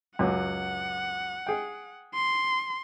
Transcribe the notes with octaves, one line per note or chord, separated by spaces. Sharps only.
C#2 F#2 F#5
G#4 G5
C6